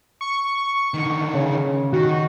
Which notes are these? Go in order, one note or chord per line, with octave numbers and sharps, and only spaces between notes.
C#6
D3 D#3
C#3
D#3 F#4